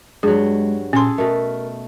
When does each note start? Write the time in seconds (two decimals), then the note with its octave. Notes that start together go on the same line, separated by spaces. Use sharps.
0.23 G2 F#3 G#3 G#4
0.93 A#2 C#4 G#4 A4 C6
1.18 B2 A3 A#4